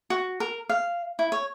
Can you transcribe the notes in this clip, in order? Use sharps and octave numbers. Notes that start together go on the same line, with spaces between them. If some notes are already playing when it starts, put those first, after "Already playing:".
F#4
A#4
F5
E4
C#5